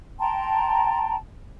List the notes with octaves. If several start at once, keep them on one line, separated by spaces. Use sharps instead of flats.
G5 A5 A#5 C6